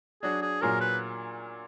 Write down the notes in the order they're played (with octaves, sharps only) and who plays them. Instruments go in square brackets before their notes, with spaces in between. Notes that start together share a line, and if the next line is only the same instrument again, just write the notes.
[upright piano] F#3 D4 F#4 [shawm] G#4
[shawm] G#4
[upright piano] A#2 F#3 A#3 F4 G#4 [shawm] A#4
[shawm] B4